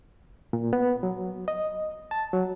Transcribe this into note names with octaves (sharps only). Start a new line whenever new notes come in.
A#2
B3
F#3
D#5
A5
F#3